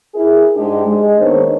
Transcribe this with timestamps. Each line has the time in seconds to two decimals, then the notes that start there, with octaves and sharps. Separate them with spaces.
0.14 E4 G#4 A#4
0.56 G#2 G#3 D4 G4
0.86 G#3
1.19 D#3 A#3 B3 D4 C5 C#5